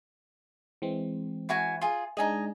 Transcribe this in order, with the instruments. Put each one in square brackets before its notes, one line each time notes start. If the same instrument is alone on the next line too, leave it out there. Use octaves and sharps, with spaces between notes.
[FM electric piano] E3 G#3 C4
[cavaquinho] E4 F#4 G#5
F4 G#4
[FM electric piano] G#3 D4 D#4 [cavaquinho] D#5 G#5 A#5